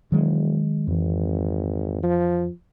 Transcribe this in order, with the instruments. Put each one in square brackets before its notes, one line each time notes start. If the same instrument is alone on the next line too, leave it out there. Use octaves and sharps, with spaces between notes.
[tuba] E1 [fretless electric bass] D#3 F#3 G#3
[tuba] G#1 [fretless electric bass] F2 E3
[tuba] F3